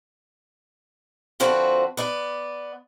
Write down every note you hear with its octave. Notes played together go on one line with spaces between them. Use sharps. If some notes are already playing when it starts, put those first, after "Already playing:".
D3 F3 C4 F#4 B4
B3 D5